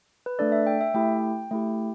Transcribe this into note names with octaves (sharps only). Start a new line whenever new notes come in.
B4
A3 D4 A4 D5
E5
G5
E5
A3 E4 G4 G5
A3 E4 G4